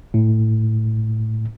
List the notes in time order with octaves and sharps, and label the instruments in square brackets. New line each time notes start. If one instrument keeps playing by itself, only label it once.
[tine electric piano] A2